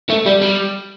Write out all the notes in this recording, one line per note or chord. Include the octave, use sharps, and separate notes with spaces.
A3
G3
G3